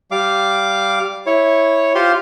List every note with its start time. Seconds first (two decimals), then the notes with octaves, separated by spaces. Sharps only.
0.11 G3 F5 D6
1.26 E4 C#5
1.95 F4 G4 C5 F5 C6